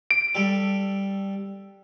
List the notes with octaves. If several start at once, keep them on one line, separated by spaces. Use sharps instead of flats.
D7
G3 A4